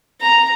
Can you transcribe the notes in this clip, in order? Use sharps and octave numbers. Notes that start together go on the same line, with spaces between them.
A#5